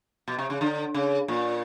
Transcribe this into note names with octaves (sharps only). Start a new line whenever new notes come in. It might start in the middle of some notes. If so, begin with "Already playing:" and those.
B2
C3
C#3
D3
C#3
A#2